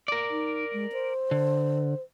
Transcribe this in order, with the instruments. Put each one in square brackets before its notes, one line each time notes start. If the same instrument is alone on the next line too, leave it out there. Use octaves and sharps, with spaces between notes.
[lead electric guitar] A#4 D5
[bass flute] D#4
G#3
C5
[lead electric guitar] D3